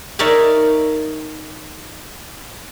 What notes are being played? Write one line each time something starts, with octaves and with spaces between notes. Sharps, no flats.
D#4 A#4 C#5 D5 E5 G#5